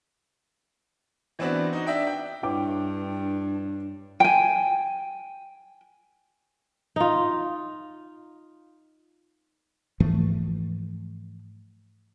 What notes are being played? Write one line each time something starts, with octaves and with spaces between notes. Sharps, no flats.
E3 B3 C4 D4 F#4
D#4 F#4
D4 E5 G5
G5
G2 D4 E4 B4 C#5 G5 D6
G5 G#5
D#4 F4
G#2 E3 F3 A3